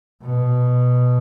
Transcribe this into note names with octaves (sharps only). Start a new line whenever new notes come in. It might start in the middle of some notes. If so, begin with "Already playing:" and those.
B2